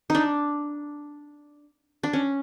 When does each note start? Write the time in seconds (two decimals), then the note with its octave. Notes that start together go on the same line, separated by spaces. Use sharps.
0.10 D4 D#4
2.03 D4
2.13 C#4